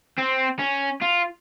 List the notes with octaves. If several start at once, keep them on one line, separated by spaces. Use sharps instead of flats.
C4
C#4
F4